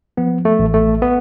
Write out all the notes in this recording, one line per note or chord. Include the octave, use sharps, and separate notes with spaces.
F3 B3
A3
A1
A3
B3